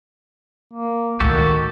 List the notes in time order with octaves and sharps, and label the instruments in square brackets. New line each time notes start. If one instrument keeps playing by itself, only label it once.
[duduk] A#3
[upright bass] D2 A2 [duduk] D#3 [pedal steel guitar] F#4 G4 A4